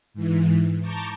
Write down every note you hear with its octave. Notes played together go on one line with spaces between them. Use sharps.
G#2 E3
A5 A#5 C#6 D6 G6